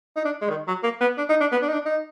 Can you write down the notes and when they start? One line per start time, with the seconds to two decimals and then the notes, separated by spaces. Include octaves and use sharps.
0.17 D#4
0.25 D4
0.42 G#3
0.50 D#3
0.68 F#3
0.83 A#3
1.01 B3
1.18 D4
1.29 D#4
1.41 D4
1.52 B3
1.62 D4
1.68 D#4
1.73 D4
1.86 D#4